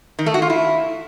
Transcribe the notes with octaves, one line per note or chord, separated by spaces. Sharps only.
D#3
A3
F#4
F4
E4